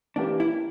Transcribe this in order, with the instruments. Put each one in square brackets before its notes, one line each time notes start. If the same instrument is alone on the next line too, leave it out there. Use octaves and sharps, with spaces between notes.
[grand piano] E3 A#3 C#4 G4 [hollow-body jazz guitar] D4
[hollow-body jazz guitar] E4